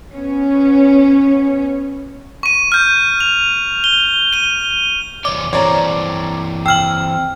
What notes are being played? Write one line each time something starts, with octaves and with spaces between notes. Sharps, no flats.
B3 C#4 C#5
C#6 D#7
F6 G6
F7
G7
D#7 G7
E2 C#5 D5 D6
E3 C4 C#5 D5 A#5
G5 E6 F6 F#7